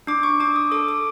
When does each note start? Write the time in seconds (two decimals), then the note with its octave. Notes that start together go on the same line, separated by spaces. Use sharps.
0.07 D4 D6
0.23 C#6
0.40 D4 D6
0.56 D#6
0.72 A4 D6
0.89 D6